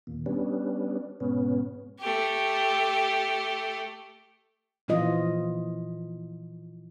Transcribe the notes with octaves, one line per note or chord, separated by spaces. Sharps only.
D#2 A#2
G3 B3 C#4 D4
G#2 B2 B3 C#4
A3 G4
A#2 E3 F3 F4 D#5